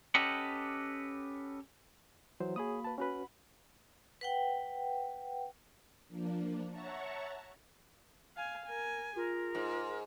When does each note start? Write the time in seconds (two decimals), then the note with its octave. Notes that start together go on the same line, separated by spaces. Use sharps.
0.15 C#4 G4 A4 B4 D#5 F#5
2.40 E3 F#3 C5
2.56 A#3 F#4 G#4 C#5 B5 D#6
2.84 B4 A5
2.98 C#4 F#4 B4 F#5 B5
4.21 B4 F#5 G5
6.09 F3 A#3 D4
6.70 C#5 E5 F#5 A5 A#5 C#6
8.36 F5 G#5
8.66 A#4 G#5
9.16 F4 G#4 A#4
9.55 G#2